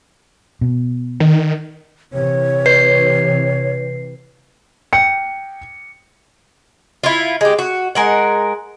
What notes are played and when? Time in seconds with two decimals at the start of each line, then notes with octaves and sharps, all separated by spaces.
0.61 B2
1.20 D#3
2.13 C3 E3 C#5
2.66 B4 C7
4.93 G5 C#7
7.04 E4 F4
7.41 G#3 G4
7.59 F#4
7.95 G#3 A#4 F#5